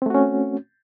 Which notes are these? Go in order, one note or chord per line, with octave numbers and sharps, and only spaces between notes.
A3 C4 C#4 F#4